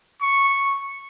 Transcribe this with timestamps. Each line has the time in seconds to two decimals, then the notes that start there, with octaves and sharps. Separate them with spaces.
0.22 C#6